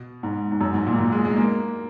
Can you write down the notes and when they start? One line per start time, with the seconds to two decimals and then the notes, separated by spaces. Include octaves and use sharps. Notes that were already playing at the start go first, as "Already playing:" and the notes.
Already playing: B2
0.23 G#2
0.52 G#2
0.61 F#2
0.74 G#2
0.87 A#2
0.93 G#2
0.99 A#2
1.12 G#3
1.25 G#3
1.37 A#3